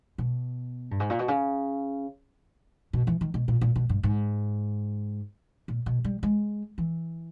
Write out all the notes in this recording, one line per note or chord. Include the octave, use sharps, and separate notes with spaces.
B2
G2
G#2
A#2
B2
C#3
B2
E3
D#3
B2
A#2
A#2
B2
G2
G#2
A#2
B2
G3
G#3
E3